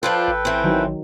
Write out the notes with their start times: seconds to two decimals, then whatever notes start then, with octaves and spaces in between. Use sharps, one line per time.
0.03 F3 D4 F4 A4 B4 G5
0.28 A1
0.45 E3 C4
0.64 D#3 F#3